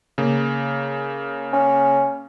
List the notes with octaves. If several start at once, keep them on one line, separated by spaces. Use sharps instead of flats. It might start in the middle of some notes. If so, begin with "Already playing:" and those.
C#3 A#3
C#4